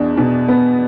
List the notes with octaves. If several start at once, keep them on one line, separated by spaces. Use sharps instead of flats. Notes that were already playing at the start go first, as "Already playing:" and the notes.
Already playing: E2 B2 D4
B2
B3